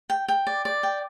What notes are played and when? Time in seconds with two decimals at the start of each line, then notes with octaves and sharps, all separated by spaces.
0.10 G5
0.28 G5
0.47 D5
0.65 D5
0.83 G5